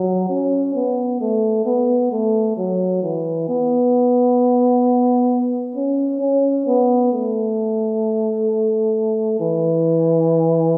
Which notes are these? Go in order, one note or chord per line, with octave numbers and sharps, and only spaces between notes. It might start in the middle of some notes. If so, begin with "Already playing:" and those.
Already playing: F#3
C#4
B3
A3
B3
A3
F#3
E3
B3
C#4
C#4
B3
A3
E3